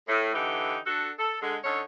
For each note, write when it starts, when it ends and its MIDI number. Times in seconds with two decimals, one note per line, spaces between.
0.08 0.32 45
0.33 0.78 50
0.33 0.78 52
0.33 0.78 63
0.33 0.78 64
0.33 0.78 67
0.87 1.10 62
0.87 1.10 66
0.87 1.10 69
1.19 1.40 69
1.41 1.56 50
1.41 1.56 56
1.64 1.80 50
1.64 1.80 61
1.64 1.80 63
1.64 1.80 69
1.64 1.80 73